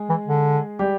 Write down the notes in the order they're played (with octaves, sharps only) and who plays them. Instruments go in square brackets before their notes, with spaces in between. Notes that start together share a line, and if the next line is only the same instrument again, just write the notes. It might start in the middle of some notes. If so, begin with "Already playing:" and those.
Already playing: [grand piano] G#3 G#4
[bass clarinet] E3
D3
[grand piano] G3 G4